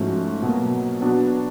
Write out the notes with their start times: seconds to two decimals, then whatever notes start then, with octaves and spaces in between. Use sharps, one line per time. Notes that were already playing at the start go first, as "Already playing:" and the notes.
Already playing: G#2 F3 A3 C#4 F#4
0.42 B2 F#3 A#3
1.01 F#3 B3 D4 F#4